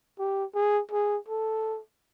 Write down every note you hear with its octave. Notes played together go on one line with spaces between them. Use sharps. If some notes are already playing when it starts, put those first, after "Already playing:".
G4
G#4
G#4
A4